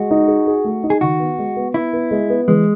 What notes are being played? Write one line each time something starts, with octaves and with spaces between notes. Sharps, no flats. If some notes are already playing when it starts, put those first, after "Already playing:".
Already playing: G#3 F#4
D#4
G#4
G#4
A3
D#4
G#4
D#3 F#4
B3
G#3
B3
B3 E4
B3
G#3
B3
E3 G#3